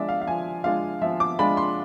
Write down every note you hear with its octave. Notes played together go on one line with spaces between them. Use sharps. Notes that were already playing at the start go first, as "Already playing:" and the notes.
Already playing: F3 G#3 D4 F4 D5 E5
F5
F5
F3 G#5
G#3 D4 F4 F5
F3 E5
D6
G#3 D4 F4 B5
C6